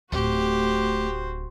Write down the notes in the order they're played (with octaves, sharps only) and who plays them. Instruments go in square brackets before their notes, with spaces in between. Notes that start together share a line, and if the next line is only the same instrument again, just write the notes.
[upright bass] D1 [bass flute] A3 [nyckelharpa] F#4 C5 [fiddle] G4